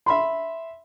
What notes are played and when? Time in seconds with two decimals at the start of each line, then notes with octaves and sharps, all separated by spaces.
0.06 E5 B5 C6